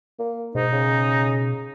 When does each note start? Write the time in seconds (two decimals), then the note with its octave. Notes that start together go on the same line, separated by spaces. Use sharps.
0.19 A#3
0.55 G#2 B2 D#4
0.73 C#3